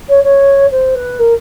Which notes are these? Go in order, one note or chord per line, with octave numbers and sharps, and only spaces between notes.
C#5
C#5
C5
B4
A#4